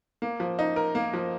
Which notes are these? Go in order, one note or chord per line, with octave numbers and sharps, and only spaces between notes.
A#3
F3
D#4
A#4
A#3
F3